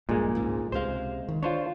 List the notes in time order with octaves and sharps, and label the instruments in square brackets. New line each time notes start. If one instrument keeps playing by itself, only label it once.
[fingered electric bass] A#1 G2 [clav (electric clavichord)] A#2 G#3
[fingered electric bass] C#2 G#2
[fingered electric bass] C#2 C3 G#3 [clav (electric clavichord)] C5 F5
[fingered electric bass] D#3
[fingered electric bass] D4 [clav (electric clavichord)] F4 C5 C#5